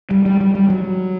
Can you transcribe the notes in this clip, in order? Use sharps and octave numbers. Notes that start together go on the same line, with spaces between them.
G3
G3
G3
G3
F#3